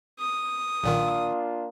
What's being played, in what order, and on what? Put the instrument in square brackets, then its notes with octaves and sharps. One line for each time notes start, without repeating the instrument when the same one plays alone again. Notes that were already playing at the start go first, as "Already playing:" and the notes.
[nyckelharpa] D#6
[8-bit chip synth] B1 A#2 D#3 [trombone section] A#3 D4 F4